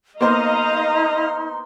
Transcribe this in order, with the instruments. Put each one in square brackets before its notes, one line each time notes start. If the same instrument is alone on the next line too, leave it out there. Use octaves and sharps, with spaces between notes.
[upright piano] A#3 B3 C5 [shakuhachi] D#4 [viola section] D#5 F5 A#5 [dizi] C6